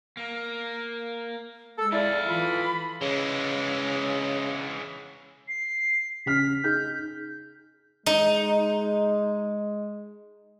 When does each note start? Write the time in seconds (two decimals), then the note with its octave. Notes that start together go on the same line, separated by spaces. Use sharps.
0.17 A#3
1.78 G#3 A4 E6
1.92 E4 A4 D5 F5
2.28 E3 F4 B5
3.01 C#3 E3 G#3
5.48 C7
6.26 C#3 F6 B6
6.64 D#4 G#4 F6 G6
8.06 G#3 D#4